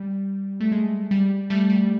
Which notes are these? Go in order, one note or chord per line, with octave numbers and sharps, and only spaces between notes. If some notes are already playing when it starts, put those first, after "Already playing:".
Already playing: G3
A3
G#3
G3
G3 A3
G3